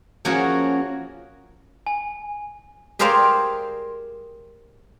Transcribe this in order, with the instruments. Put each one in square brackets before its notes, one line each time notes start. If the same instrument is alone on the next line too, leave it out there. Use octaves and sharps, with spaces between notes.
[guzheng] F3 A#3 C#4 F#4 G#4 C#5
[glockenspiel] G#5
[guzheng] G4 G#4 A#4 C5 D5 F5